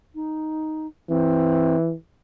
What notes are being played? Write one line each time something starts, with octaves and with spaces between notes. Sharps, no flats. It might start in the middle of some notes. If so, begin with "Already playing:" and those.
D#4
E3 C4